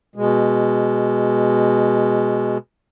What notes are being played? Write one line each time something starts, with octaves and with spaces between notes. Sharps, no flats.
B2 G#3